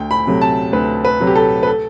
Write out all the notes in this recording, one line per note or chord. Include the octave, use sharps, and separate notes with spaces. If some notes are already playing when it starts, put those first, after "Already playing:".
Already playing: D2 G5
B5
C3 F#3 A3
A5
D2 B4
B4
C3 F#3 A3
G4
A4
B4
A4